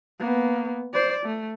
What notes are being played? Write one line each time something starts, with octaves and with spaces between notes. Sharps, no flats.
A#3 B3
C5 D5
A3